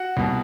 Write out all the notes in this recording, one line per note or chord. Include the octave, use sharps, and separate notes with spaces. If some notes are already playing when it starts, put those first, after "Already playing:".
Already playing: F#4 F#5
C2 B2